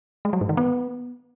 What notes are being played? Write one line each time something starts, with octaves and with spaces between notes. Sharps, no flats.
G#3
F#3
G#2
D#3
B3